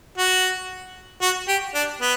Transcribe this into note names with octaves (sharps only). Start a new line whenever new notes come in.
F#4
F#4
G4
D4
B3